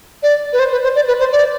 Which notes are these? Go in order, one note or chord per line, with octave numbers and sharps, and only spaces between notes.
D5
B4
C5
B4
C5
D5
B4
C5
D5